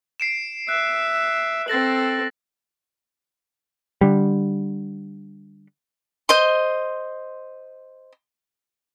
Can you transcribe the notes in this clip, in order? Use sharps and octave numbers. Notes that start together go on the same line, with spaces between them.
C7 D7 E7
E5 F#6
C4 A4 A6 A#6 F#7
D3 G3
C5 D#5 C6